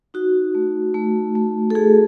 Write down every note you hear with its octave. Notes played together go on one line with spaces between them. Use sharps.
D#4 F#4
A3
A3
A3
A4
A3 G#4